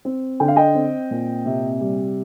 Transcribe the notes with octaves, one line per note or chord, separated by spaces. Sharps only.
C4
D3 G5
F5
D#5 G5
C4
A#2
C3
G3